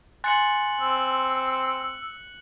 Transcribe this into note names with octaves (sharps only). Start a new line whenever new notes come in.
G#5 C6 F#6 A6 C#7 F#7
C4 E6